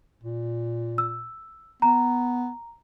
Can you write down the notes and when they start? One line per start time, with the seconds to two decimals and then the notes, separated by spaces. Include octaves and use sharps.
0.24 A#2
0.98 E6
1.82 B3 A#5